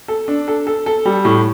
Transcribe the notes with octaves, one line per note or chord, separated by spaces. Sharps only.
A4
D4
A4
A4
A4
G3
A2